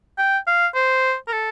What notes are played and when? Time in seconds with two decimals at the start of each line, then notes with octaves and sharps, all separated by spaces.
0.18 G5
0.47 F5
0.75 C5
1.27 A#4
1.32 A4